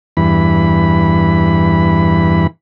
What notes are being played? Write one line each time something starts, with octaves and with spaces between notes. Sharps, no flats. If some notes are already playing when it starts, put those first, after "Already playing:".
E2 G2 E3 B5